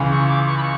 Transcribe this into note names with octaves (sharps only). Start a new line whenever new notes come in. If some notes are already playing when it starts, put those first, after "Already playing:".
Already playing: C#2 C#3 E3
C#6
D6
C#6
B5
C#6